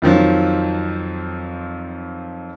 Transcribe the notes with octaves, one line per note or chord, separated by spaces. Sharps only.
F2 D#3 F3 F#3